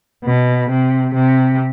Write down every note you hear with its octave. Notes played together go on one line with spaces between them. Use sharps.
B2
C3
C3